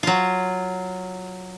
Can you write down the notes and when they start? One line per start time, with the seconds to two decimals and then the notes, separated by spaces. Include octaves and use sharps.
0.03 F#3 F4